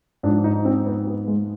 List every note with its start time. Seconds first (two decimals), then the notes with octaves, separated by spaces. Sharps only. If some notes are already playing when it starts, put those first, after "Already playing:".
0.23 G#2 D4
0.28 F3
0.44 D#4
0.65 C4
0.86 B3
1.07 B3
1.28 G#3